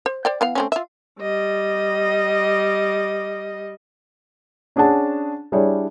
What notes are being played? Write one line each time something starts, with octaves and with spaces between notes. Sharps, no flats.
C5
C5 D5 G5
E3 B3 F5
A3 C4 C#4
F4 E5
G3 D#5
C#4 D4 G#4 F#5 A5
G3 D4 E4 G#4 C#5